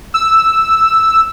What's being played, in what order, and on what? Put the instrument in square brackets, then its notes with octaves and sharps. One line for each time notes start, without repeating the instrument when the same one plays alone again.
[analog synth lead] E6